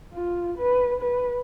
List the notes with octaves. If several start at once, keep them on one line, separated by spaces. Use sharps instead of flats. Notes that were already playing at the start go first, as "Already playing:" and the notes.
F4
B4
B4